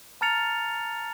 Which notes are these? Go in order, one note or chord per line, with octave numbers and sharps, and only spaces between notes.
A5 A#5 F6 A6 C#7 F7